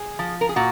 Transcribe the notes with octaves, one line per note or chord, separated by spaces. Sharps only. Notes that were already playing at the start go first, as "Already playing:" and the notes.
Already playing: G#4
F3
A#4
G#4
A#2 F#4